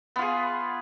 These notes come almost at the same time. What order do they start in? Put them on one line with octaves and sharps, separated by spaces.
B3 F4 G#4